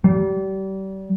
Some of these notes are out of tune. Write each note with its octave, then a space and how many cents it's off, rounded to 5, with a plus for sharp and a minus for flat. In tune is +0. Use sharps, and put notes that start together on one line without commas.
G3 -30